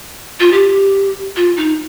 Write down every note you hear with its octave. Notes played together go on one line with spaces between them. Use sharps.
F4
G4
F4
D#4